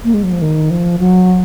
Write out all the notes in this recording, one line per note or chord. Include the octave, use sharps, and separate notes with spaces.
A#3
G#3
F#3
F3
D#3
F3
F#3